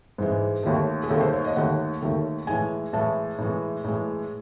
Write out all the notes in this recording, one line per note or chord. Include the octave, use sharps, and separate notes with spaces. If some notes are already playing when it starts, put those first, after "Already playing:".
G#2 E3 G#3
D#2 D#3 A3
G#4
D#2 D#3 A3 A4
C5
C#5
D#5
D#2 D#3 A3 F#5
D#2 D#3 A3
A2 E3 G#3 G#5
A2 E3 G#3 A5
A2 E3 G#3
A2 E3 G#3